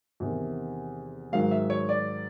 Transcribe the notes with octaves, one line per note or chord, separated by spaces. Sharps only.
E2 C3 D#3
G#2 D#3 F#3 F5
E5
C#5
D5